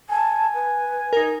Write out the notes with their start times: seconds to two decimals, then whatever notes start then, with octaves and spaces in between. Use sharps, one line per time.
0.09 G#5 A5
0.54 B4
1.13 D#4 A#4